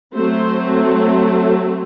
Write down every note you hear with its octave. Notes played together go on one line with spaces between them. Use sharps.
F#3 A3 C4 C5